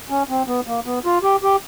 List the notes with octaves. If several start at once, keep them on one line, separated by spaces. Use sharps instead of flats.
C#4
C4
B3
A#3
B3
F4
G4
G4